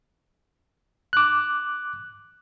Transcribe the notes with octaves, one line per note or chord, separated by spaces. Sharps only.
D6 F#6